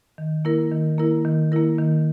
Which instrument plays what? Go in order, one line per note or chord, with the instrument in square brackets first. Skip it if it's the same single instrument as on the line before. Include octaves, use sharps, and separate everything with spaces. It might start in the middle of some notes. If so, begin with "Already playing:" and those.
[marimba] D#3
A#3 E4 A#4
D#3
A#3 E4 A#4
D#3
A#3 E4 A#4
D#3